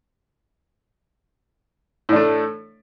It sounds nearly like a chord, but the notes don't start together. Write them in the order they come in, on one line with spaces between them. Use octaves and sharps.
A2 D4 A3